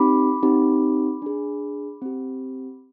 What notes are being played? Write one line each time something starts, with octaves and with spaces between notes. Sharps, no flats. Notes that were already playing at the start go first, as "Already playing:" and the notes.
Already playing: C4 D#4 G4 B5 D6
C4 D#4 G4
D4 G#4
C4 G4